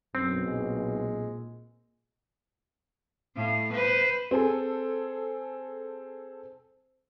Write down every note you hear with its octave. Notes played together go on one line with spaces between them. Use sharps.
B1 F#2 C4
A#2 G#3
A2 F5
B4 C5
C4 G#4 A4